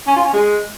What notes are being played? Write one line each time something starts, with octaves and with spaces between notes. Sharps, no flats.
C#4
F4
C#4
G#3